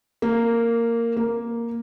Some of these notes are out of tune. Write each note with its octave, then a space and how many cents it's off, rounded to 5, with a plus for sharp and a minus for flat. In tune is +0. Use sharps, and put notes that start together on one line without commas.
A#3 -10
A#3 +0